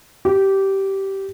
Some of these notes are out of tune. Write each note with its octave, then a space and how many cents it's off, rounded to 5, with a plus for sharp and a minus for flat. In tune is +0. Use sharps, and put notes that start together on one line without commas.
G4 -15